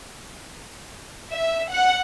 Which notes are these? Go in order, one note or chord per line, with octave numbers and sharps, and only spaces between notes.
E5
F#5